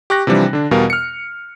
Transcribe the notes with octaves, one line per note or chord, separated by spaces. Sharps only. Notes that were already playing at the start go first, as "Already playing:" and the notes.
G4 C#6 F#6 A#6
C3 E3 F3 G3 D4
D3 D4
E2 B2 G3 A#4 F5
F6 C#7